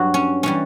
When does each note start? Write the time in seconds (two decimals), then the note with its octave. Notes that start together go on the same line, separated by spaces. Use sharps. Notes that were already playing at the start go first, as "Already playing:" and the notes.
Already playing: G2 F#3 F#4
0.14 C#4
0.43 E3 G3 C#4